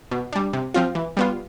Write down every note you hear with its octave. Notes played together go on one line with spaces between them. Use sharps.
B2
G3 D4
C3
F3 C4 F4
E3
G3 B3 F4